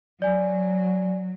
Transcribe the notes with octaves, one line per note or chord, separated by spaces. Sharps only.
F#3 D5 G#5